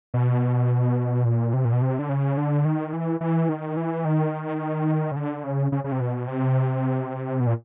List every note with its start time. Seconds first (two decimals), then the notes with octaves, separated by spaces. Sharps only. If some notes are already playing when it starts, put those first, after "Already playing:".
0.14 B2
1.25 A#2
1.53 C3
1.65 A#2
1.73 B2
1.82 C3
1.99 D3
2.09 C#3
2.37 D3
2.65 D#3
2.93 E3
3.21 E3
3.49 D#3
3.77 E3
4.05 D#3
5.12 C#3
5.16 D3
5.44 C#3
5.72 C#3
5.84 C#3
5.92 C3
6.00 B2
6.28 C3
7.40 B2
7.47 A#2